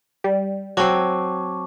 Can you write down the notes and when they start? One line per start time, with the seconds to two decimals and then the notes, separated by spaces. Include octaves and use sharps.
0.24 G3
0.77 F#3 C4 A5 C#6 D6